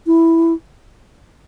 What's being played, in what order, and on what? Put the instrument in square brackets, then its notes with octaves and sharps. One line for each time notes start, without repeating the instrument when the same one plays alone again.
[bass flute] E4